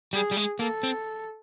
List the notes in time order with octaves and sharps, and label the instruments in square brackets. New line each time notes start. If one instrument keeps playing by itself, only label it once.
[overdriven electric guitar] G3 [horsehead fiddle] G#4
[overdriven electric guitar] G3
G#3
[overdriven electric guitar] A#3 [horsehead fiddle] A4
[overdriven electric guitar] C4